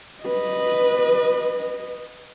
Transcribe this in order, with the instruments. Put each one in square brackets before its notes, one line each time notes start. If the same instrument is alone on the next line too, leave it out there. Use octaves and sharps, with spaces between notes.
[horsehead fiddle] B4 D#5